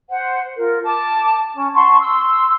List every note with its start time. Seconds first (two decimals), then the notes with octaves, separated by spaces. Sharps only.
0.09 C5 F#5
0.57 F4 A#4
0.83 A5 D6
1.53 C#4
1.74 F#5 A5 C6 C#6
2.00 C6 E6